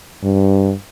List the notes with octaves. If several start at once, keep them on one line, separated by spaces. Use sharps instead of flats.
G2